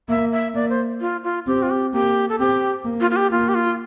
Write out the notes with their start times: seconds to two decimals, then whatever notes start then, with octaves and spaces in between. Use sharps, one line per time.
0.09 A#3 E5
0.32 E5
0.55 A#3 D5
0.70 C5
1.01 F4
1.24 F4
1.47 C4 G4
1.63 F4
1.70 G4
1.93 A#3 G4
2.29 A4
2.39 C4 G4
2.85 A#3
3.01 F4
3.11 F4
3.16 G4
3.31 A#3 F4
3.48 G4
3.55 F4